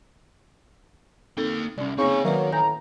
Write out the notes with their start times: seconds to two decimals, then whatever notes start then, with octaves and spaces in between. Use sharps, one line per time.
1.37 A#3 C4 D#4 A4 G5
1.78 C2 C#4 D5
1.98 C#3 A#3 C4 D#4 G#5 C#6
2.25 D#3 F#3 A#3 B4 D5 E5
2.52 A2 G#5 A#5 G6